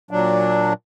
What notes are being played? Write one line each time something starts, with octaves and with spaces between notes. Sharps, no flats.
A#2 F#3 D4